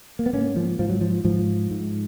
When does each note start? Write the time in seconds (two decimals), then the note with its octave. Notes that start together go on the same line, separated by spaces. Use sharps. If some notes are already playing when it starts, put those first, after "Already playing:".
0.19 A#3
0.26 B3
0.33 G#2 A#3 C#4
0.56 F3
0.79 G#2 F3
0.90 F#3
1.01 F3
1.24 G#2 F3
1.71 G#2